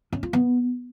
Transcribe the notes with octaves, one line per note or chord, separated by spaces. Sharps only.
C#4
F4
B3